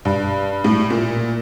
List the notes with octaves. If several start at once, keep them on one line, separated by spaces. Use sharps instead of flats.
G2
A2
A#2